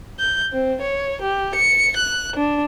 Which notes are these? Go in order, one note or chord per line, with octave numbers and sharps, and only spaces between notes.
G6
C4
C#5
G4
C#7
F#6
D4